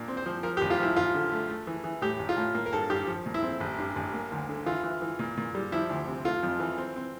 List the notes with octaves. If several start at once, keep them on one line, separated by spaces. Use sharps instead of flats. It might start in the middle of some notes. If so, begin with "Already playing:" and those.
Already playing: A#2 D4
C4
C5
F3
F3 A#4
G4
A1
F4
F3 E4
A1 F4
D3
A3
A3
E3
E3
A2 G4
A1
F4
A2
A#3
A#4
G2 A4
G2 G4
F3
A#2
E4
C4
A1
G2
A1
A#3
D2
D3
E3 F4
E3
E3
A#2
A#2
G3
F3 E4
D2
C3
A3 F4
F2
E3
C4
C4